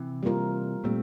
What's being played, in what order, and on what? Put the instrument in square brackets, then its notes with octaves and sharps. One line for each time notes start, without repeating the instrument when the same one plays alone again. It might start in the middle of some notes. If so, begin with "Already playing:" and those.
Already playing: [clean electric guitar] C3 E3
[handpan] G3 A#3 F4 A#4
[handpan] A#2 G3 A#3 [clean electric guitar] A3 C4